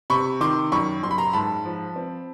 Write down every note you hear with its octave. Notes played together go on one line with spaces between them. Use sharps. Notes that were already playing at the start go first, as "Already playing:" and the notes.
C3 B5 C#6
D#3 C6 D6
F#2 B5 C#6
F#2 C6
B5
A#5 C6
G#2 A5 B5
F3
C4